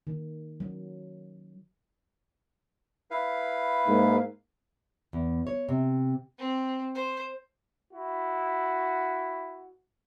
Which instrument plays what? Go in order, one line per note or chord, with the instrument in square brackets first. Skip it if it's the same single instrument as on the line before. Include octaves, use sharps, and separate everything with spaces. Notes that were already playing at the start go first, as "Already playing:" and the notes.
[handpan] D#3
F#3
[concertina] E4 B4 F5
[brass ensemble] G#2 A#3
[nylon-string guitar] E2
C#5
C3
[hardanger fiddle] C4
C5
[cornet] E4 [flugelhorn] F#4